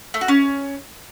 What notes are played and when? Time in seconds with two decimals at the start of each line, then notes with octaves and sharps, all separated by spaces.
0.14 A3
0.21 F#4
0.28 C#4